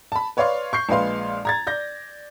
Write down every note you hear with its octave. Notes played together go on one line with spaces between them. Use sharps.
A5 B5
B4 C#5 D5 F5 C6 C#6
C#6 G6 C7
A#1 G#3 B4 F5 C6
A#5 G#6 A6
D5 G6 A#6